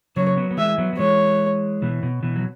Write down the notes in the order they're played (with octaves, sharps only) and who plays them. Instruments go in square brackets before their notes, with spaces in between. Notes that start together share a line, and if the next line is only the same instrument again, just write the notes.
[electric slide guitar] C#3 F#3 [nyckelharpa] C#5
[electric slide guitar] F#3 B3
B3
[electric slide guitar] E3 G#3 [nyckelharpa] E5
[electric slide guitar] F#3 B3
F#3
[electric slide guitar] E3 G#3 [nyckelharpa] C#5
[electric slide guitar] B2 E3
B2
B2 E3
F#3